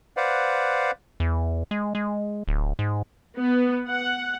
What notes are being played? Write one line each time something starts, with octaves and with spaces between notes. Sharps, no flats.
B4 C5 D5 F5 F#5
E2
G#3
G#3
D1
G#2
B3
F#5